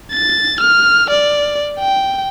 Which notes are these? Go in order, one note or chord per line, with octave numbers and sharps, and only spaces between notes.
A6
F6
D5
G5